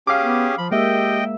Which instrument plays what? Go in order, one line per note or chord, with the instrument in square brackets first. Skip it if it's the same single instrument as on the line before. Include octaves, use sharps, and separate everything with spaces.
[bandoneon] C#4 G4 G#4 [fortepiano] F5 D6
[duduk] B3
[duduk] F3 [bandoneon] B5
[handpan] G#3 A#3 E5 [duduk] G4 [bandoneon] D#5 G5